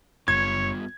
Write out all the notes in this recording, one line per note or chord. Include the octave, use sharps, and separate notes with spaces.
F#1 G3 B3 F4 C#5 G#6